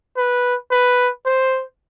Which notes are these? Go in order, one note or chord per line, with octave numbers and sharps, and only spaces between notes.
B4
B4
C5